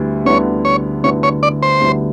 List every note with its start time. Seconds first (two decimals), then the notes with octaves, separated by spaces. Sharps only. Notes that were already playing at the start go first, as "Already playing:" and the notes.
Already playing: D2 D3 G3 B3 E4
0.25 D2 D3 G3 B3 E4 C#5
0.65 C#5
1.03 D2 D3 G3 B3 E4 C#5
1.23 C#5
1.43 D5
1.63 C5
1.81 D2 D3 G3 B3 E4